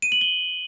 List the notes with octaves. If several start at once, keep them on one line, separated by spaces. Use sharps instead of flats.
D#7
F#7
G7